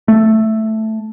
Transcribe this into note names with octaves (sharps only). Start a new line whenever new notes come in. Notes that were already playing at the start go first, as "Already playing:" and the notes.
A3